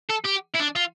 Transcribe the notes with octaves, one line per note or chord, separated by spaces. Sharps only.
A4
G4
E4
D4
F4